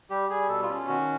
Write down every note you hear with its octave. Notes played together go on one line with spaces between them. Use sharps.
G3 G4
G3 G#4
B2 A4
F4
C#4
F4
D#3 F#4